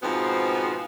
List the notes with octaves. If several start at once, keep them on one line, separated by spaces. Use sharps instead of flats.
G#2 B2 F3 B3 C4